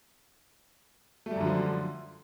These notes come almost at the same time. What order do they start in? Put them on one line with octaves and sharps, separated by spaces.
A3 G3 F#2 D3 F3